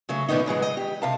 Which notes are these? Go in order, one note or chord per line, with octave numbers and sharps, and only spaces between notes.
C#3 F#3 A3
A2 D3 D#3 B3 D#4
C#3 E3 F#3 G#3
D#5
G4
C3 F5 A5